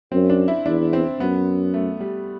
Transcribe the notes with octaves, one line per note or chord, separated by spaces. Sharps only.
F#2 C4
D4
E4
E2 D4
C4
F#2 B3
A3
G3